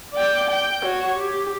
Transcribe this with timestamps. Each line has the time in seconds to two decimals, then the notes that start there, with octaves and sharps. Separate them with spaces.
0.13 D5 G5
0.50 G5
0.82 F#4 C#5
1.15 G4